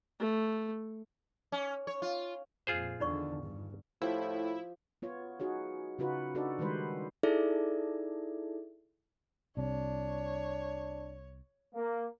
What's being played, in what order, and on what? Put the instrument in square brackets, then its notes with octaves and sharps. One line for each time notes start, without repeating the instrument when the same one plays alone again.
[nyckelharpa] A3
[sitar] C#4
C#5
F4
[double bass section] F2 A#2 [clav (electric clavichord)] F4 G#4 C5
[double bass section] E2 D3 D#3 [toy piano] D#4 D5 C#6
[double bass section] G1 G2
[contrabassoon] A2 [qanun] F3 G4 [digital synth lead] E4
[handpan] B3 F4 C#5
D#4 F#4 G#4 C#5
C#3 D#4 F4 F#4 B4
D4 D#4 F#4 A4 B4 D5
D#3 G3 G#3 B4 C5
[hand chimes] D#4 E4 G#4 A4 D5 E5
[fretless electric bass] C2 C3 [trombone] D4 [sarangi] C#5
[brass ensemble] A#3